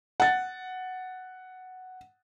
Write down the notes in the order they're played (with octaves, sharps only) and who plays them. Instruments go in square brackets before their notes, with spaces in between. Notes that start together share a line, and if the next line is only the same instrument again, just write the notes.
[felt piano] F#5 A6